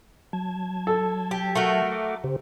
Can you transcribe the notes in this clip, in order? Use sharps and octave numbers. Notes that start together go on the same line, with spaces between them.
F#3 A5 G#6
A4
G4
A3 F#4 A#4
D6
C#3 G4 C5